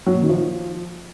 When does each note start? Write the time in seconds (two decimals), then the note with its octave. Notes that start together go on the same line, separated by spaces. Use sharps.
0.06 F#3
0.14 A#2
0.22 D#3
0.29 F3